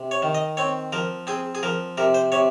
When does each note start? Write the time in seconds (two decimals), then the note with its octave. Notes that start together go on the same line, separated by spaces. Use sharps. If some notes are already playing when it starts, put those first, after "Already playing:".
Already playing: C3
0.11 C#5
0.22 D#3
0.35 D#5
0.57 C4 C#5
0.93 F3 A#4
1.27 C4 G#4
1.55 G#4
1.63 F3 A#4
1.98 C3 A#4
2.14 C5
2.32 C3 C#5